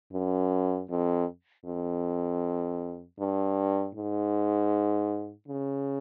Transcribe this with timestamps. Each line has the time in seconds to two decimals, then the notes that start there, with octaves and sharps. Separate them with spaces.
0.13 F#2
0.90 F2
1.66 F2
3.20 G2
3.95 G#2
5.48 C#3